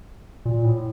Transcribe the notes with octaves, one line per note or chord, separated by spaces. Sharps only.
A#2
A2